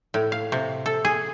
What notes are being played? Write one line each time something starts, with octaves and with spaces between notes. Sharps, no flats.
A2
F5
C3
A4
G#4